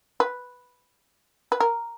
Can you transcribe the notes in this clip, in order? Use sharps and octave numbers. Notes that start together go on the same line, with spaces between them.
B4
B4
A#4